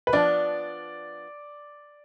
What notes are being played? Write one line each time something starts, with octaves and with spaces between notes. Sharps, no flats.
B4
F3 B3 D4 D5